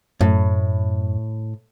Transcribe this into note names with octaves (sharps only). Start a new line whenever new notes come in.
F#2 A2